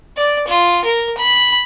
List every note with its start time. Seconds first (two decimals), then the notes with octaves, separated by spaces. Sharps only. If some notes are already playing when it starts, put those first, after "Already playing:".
0.17 D5
0.47 F4
0.85 A#4
1.17 B5